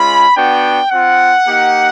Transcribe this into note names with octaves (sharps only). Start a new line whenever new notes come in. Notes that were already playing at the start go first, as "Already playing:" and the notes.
Already playing: G#3 C#4 F4 B5
B3 D4 F#4 G5
C4 F4 F#5
A#3 D#4 G4